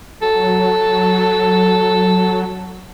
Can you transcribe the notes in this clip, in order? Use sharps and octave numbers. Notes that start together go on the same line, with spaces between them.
F#3 A4